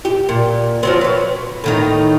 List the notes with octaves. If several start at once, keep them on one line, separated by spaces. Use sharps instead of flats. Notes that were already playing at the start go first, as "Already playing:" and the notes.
G4
A#2
F3 F#3 C4
B4 C#5
A2 D#3 D#4